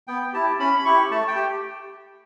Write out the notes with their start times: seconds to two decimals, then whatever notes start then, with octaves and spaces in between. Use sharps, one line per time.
0.07 B3 G5
0.33 E4 G4 A5
0.59 C#4 B5
0.79 B5
0.85 E4 G4 C#6
1.11 A3 A5
1.28 G5
1.36 G4